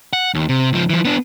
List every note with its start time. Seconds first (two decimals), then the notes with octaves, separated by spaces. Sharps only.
0.13 F#5
0.34 D#2
0.49 C3
0.73 C#2 F3
0.90 E3 F3
1.05 B3 D4